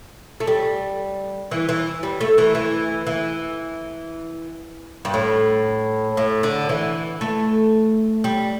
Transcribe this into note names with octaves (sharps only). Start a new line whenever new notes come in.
A3
G3
E3
E3
G3
A3
E3
E3
E3
G2
A2
A2
D3
E3
A3
G3